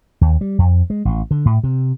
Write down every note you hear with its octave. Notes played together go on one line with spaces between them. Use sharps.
D#2
G3
F2
G#3
A1
D3
A2
C3